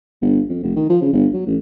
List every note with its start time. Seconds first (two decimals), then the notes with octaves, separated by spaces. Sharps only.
0.21 G1
0.49 F2
0.63 F1
0.76 D#3
0.90 F3
1.02 C#3
1.13 G1
1.34 F#3
1.47 A1